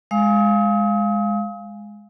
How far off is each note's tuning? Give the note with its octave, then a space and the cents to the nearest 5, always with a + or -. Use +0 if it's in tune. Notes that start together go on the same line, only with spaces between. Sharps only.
G#3 +0 F5 +0 D#6 +40